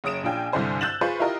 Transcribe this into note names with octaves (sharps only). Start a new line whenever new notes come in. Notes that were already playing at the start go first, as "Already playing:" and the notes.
F#1 C#5 D#6 D7 E7
A#1 D4 F4 G5 G#5
C2 G2 D3 E4 C5 G#5
E6 F#6 G6 A6 E7 F#7
F4 G#4 B4 C5 C#6
E4 F4 G4 A#4 D#5